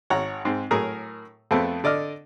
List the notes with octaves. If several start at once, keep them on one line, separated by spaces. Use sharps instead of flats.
G#1 C#5 F#5 A#5
G#2 C4
A2 F#3 G#4 A#4 A#5 D#6
F2 A3 B3 C4 A5
D3 D5 D#5 F6